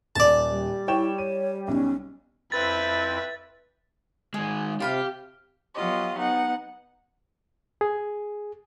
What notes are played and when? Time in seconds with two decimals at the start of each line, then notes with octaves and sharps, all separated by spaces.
0.16 D#1 D5 A5
0.52 G3
0.88 E4 C#5 G5 E7
1.18 C#5 D#7
1.68 B1 C#4
2.52 F2 C4 E4 B4 E5 A6
4.34 D#3 G#3 G#4 G#5
4.80 C3 F4 G4 F5 B5 D6
5.74 F#3 B3 F4 G4 D#5
6.17 B3 D#4 F#5
7.81 G#4